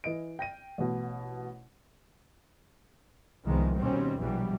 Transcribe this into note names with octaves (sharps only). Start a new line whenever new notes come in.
E3 D#5 D7
G5 A#6 D#7
A1 B2
C2 D#3 F3 G#3 B3
D#2 B2 G3 C4 C#4
A#1 E2 B2 E3 F#3 G3